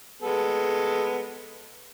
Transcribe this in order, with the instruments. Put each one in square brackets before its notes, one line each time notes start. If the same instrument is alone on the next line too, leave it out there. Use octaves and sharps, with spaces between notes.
[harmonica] G#3 B3 A4